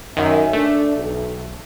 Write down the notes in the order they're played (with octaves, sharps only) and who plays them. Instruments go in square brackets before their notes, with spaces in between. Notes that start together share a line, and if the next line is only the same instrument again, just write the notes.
[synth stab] F#2 D#3 [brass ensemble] E5 G#5
[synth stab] A3 [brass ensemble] D4
[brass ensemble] B1